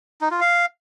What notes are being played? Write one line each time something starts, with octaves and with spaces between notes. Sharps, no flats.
D#4
F4
F5